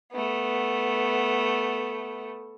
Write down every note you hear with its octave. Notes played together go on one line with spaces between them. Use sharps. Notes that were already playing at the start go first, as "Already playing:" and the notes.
A3 B3